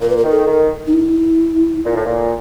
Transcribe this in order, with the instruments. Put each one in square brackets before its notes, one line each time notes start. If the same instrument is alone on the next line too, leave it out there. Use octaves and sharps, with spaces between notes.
[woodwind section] A#2 [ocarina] A#4
[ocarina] B4
A#4
[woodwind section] D#3
[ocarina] A4
[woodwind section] D#3
[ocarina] D#4
E4
[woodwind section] A#2
A2
A#2